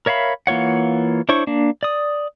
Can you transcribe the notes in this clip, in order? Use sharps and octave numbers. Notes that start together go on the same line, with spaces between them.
A#4 C#5 E5 F5 B5
E3 A#3 F4 C#5 F#5
D4 E4 C5 C#5 C#6
A#3 D4
D5 D#6